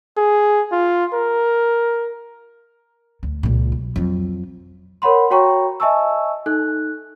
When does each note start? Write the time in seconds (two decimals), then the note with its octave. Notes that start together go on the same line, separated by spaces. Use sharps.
0.17 G#4
0.72 F4
1.13 A#4
3.23 D2
3.43 C#2 A#2
3.72 B1
3.96 F2 F#3
5.02 A#4 C#5 F#5 B5 C6
5.31 F#4 C#5 G5 A#5 C#6
5.80 D#5 E5 G#5 A5 C#6 E6
6.46 D#4 A4 F#6